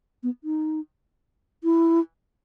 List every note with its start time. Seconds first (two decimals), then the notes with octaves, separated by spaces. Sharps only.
0.23 B3
0.44 D#4
1.64 E4